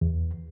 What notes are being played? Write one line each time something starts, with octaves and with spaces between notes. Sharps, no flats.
E2